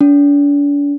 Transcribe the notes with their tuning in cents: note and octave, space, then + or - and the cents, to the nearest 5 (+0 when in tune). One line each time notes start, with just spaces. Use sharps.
D4 -40